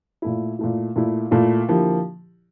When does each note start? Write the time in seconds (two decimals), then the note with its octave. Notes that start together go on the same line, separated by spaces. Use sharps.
0.22 A#2 A3 E4
0.59 A#2 A3 E4
0.96 A#2 A3 E4
1.31 A#2 A3 E4
1.68 D3 F3 A#3 E4 G4